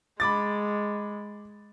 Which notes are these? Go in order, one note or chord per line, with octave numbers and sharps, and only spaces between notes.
G#3 B5 D6 A6